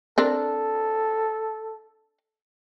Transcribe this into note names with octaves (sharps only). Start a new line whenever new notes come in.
C4 D4 A4 A#4